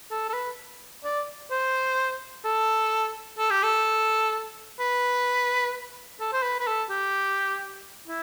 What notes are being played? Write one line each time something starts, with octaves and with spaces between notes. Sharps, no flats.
A4
A4
B4
D5
C5
A4
A4
G4
A4
B4
A4
C5
B4
B4
A4
G4
E4